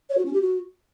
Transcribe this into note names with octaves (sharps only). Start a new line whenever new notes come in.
C#5
F#4
C#4
G4
F#4